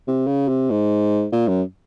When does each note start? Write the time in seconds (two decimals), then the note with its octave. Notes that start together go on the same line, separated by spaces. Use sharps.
0.08 C3
0.27 C#3
0.48 C3
0.70 G#2
1.32 A#2
1.48 F#2